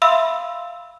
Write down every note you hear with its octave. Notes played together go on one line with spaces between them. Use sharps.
E5 F5 B5 C6 E6